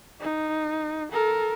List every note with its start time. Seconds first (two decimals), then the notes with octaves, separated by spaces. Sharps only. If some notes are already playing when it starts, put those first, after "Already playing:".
0.21 D#4
1.12 A4 A#4